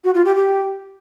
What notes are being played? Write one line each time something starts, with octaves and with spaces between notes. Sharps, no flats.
F#4
F4
G4
G4